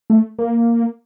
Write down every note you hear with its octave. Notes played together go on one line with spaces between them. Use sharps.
A3
A#3